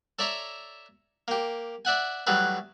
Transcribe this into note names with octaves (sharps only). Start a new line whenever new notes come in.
A4 C#5 D5 E5 A#5
A#3 G4
D5 E5 F#5 G#5
E3 F#3 G3 A3 G#4 B4